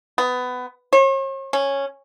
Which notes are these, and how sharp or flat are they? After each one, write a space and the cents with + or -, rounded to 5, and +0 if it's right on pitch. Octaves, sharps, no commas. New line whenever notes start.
B3 +20
C#5 -45
C#4 -5